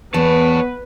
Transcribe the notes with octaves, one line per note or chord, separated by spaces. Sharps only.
E2 B3 B4 C#5 A5